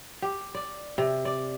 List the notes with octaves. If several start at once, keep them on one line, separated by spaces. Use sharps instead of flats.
G4
D5
C3
D5